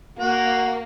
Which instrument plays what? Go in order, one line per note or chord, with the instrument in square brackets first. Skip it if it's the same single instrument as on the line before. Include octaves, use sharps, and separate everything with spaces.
[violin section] A#3 [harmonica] F#4